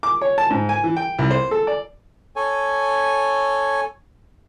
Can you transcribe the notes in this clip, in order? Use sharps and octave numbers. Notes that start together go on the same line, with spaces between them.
D6
C#5
A5
G#2
G#5
E3
G5
C2
C5
A4
D5
A4 C#5 G#5